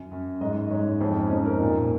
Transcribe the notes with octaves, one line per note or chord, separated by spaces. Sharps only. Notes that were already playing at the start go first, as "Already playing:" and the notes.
Already playing: F#2
F#2
G#2 D#5
G#2 C#5
F2 C5
C#4
F2 D#4
A#4
A#2